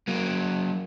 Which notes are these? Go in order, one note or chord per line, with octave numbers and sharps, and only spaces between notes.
F#3 A#3